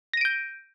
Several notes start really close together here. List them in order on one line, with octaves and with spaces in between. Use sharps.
A#6 D#7 D7 G6